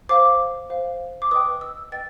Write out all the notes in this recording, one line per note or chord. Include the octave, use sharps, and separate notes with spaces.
C5 F5 D6
C5 F5
D6
B4 D#5 G5 D#6
E6
B4 D#5 G5 A6